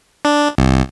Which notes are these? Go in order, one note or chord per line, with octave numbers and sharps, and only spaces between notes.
D4
C2